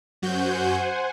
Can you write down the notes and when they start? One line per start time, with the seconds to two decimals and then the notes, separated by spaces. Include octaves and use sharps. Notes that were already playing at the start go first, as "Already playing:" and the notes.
0.22 F#2 F#4 C5 F#5 G#5 G6